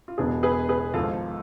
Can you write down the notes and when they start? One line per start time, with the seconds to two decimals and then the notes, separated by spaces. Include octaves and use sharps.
0.08 F4
0.18 E1 E2 B2 B3 D4 G#4
0.43 G#4 B4
0.69 G#4 B4
0.94 G#1 G#2 F3 F4 A4